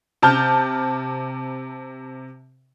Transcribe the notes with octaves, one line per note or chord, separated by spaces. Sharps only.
C3 A5 F6 G6